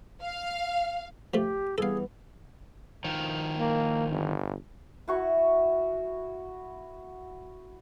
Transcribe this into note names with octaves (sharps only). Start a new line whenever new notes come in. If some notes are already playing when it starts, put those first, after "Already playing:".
F5
F3 A3 G4
E3 G3 B3 G#4 A4 F5
D#3 F3
A#3
G1
E4 F#4 C#6